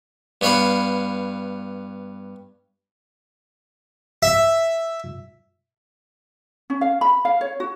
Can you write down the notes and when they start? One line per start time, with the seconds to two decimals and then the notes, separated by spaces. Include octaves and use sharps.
0.41 G2 B3 C#5 F5 B5
4.23 E5
6.70 C#4
6.81 F5
7.01 B5
7.25 F5
7.41 C#5
7.60 F#4